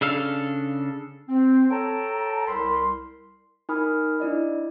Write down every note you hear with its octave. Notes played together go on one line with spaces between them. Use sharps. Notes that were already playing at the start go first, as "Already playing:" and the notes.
C#3 D4 A4 F5
C4
A4 C#5 G5 A5 A#5
C2 A#4 B5 C6
D#4 A#4 G#5 B5 D#6 F6
D4 E4 D5 D#5